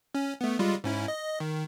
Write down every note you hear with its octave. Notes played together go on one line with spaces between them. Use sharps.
C#4
A3 B3
G3 G#3 F4
G#2 C#4 E4
D#5
D#3